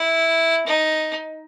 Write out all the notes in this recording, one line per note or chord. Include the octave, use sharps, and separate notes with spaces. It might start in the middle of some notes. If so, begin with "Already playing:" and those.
Already playing: E4
D#4